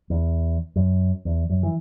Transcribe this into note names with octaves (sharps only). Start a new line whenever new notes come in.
E2
F#2
E2
F#2
E3